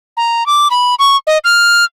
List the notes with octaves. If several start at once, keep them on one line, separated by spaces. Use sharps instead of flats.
A#5
D6
B5
C#6
D#5
F6